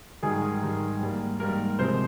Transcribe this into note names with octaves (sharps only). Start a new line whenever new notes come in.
G#2 D#3 G3 G#4
A#4
G#2 D#3 G3
G#2 G3 A#3
G#2 G3 A#3 A#4
C3 F3 G#3 C5